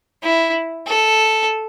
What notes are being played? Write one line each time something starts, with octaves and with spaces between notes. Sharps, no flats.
E4
A4